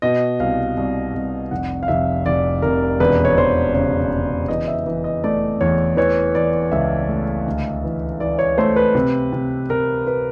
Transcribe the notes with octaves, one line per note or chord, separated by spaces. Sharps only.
B2 D#5
C2 F5
C2
C2
F1 F#5
F5
F1 E5
F1 D5
F1 A#4
E1 B4
C#5
E1 C5
C#3 C#5
C#3
E3 D#5
E5
E3
D#5
A3 D5
E2 C#5
E3 C#5
E3 D5
C#2 E5
A3
D2
E3
E3 D5
C#5
A3 C5
B4
C3
C3
C3 A#4
B4